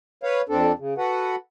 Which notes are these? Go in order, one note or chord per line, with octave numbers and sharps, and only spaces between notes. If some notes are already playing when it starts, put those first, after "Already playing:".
B4 C#5 F5
F2 C4 D4 A4
C#3
F#4 A4 B4 F#5